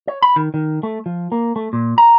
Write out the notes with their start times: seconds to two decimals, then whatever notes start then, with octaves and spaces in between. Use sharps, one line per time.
0.07 C#5
0.22 B5
0.36 D#3
0.54 D#3
0.83 A3
1.06 F3
1.32 A#3
1.56 A3
1.73 A#2
1.98 A#5